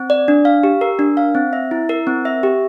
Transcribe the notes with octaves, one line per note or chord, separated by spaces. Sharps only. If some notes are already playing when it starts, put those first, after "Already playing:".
Already playing: C4
D5
D4
F5
G4
A#4
D4
F5
C4
E5
E4
A#4
C4
E5
G4